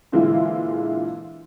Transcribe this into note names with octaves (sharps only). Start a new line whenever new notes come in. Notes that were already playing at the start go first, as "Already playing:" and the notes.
A#2 D3 E3 G#3 E4 F4